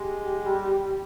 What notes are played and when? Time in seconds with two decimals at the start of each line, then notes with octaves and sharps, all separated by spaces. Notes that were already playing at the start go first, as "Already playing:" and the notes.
Already playing: G#3 G4
0.45 G3